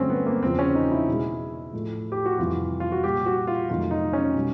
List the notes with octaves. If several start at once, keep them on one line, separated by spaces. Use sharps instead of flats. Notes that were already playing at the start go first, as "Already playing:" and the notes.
Already playing: G2 D3 F#3 A3 C4 C#4
B3
A#3
E2 C#3 F3 C4
C#4
D#4
E4
B2 G#3
A2 F3 A3
G4
F#4
F2 C3 E3 G3 F4
F4
F#4
A#2 G3 G4
F#4
F4
F2 C3 D#3 F#3 A3 F4
D#4
C#4
B2 G3